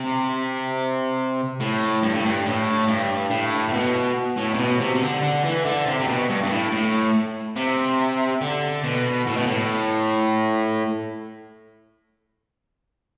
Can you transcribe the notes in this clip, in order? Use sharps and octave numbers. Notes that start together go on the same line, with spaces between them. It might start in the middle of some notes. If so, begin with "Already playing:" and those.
Already playing: C3
A2
G2
A2
G2
A2
G2
A2
A2
B2
A2
C3
B2
C3
C3
D3
D3
E3
D3
C3
C3
B2
G2
G2
A2
A2
C3
D3
B2
A2
B2
A2